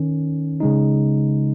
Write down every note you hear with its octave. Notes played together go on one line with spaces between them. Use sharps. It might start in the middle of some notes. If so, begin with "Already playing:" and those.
Already playing: D#3 C#4
C#3 G#3 D#4